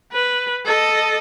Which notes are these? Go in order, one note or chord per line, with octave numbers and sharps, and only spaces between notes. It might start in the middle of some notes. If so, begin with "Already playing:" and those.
B4
A4 D#5